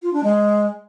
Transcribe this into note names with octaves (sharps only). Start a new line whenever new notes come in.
F4
D4
G#3